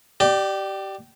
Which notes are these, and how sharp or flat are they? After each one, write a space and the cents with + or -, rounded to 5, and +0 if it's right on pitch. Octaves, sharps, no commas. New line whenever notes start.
G4 -20 D5 +20